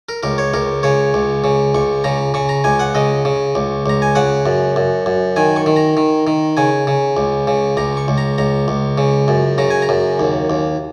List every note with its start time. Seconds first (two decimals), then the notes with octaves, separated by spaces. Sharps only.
0.09 A#4
0.23 C#2 A#4
0.38 C#5
0.54 C#2 A#4
0.83 C#3 C#5
1.14 C#2
1.44 C#3
1.75 C#2 C#6
2.04 C#3 A#5
2.34 C#3 C#6
2.49 A#5
2.64 C#2 G#5
2.80 F#5
2.95 C#3 D#5
3.25 C#3
3.55 C#2
3.86 C#2 A#5
4.02 G#5
4.15 C#3 F#5
4.46 F#2
4.76 F#2
5.06 F#2
5.36 D#3 G#5
5.56 C#6
5.66 D#3
5.76 A#5
5.97 D#3
6.27 D#3
6.57 C#3 G#5
6.87 C#3
7.17 C#2
7.47 C#3
7.77 C#2 A#5
7.97 C#6
8.08 C#2
8.18 A#5
8.38 C#2 A#5
8.68 C#2
8.98 C#3
9.28 F#2
9.58 C#3 A#5
9.70 G#5
9.82 A#5
9.89 F#2
10.20 D#2
10.50 D#2